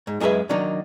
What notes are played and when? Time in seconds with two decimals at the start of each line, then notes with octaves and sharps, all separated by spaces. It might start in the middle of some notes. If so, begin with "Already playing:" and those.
0.07 G#2
0.20 F#2 G#3 G#4 A#4 B4 E5
0.49 D#3 F#3 A#3 D4 D#4